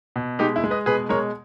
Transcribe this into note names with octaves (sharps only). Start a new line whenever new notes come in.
B2
G#3 D#4 G4
E4
G#3
B4 D#5
B2 G#4 B4
G#3 A#4 C#5